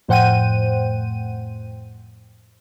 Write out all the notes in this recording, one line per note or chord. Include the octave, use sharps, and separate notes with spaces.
F2 A2 C5 F#5 G5 D#7